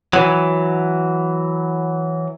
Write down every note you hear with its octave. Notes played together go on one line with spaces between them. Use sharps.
E3 F#3